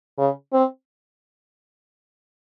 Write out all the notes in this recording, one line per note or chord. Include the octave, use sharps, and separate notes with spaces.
C#3
C4